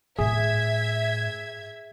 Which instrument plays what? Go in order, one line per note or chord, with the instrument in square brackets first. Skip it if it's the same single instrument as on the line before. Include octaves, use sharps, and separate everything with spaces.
[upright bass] A2 [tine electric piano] G#4 [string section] E5 G#6